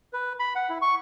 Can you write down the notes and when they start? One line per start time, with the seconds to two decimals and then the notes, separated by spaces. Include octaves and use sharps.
0.13 B4
0.39 B5
0.55 F#5
0.69 E4
0.82 C#6